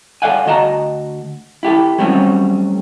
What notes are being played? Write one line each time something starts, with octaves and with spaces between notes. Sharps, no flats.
A4 C5 D5 F5 F#5 G#5
D2 F#4 D#5 A5 A#5
E4 G4 A4
F#3 G3 A3 C4 C#4 F#4